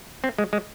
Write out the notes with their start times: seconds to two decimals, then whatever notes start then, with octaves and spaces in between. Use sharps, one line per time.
0.24 C4
0.38 G#3
0.53 G#3